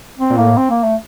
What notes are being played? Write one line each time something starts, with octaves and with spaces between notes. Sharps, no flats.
C4
A#2
A2 A#3
C4
A#3
A3